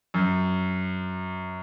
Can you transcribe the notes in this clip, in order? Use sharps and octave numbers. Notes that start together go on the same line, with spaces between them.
F#2